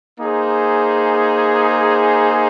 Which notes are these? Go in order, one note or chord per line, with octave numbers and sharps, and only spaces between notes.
A#3 D#4 G#4 C5